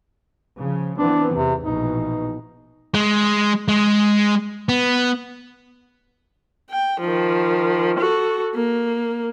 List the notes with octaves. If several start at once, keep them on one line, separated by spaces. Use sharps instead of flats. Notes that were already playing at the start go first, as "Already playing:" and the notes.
C#3 F3
E3 B3 C4 D4
E2 C3
A#1 B2 E3 D#4
G#3
G#3
B3
G5
D#3 F3
F#4 A4
A#3